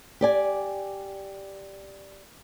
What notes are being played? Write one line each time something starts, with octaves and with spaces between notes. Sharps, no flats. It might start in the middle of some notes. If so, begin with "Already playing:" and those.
G4 D5 G#5